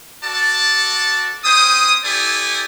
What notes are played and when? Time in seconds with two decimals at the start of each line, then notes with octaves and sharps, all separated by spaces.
0.24 F#4 A4 D5 A5
1.44 C#4 C5 G5 D#6
2.05 E4 G4 A4 D5 G#5 D#6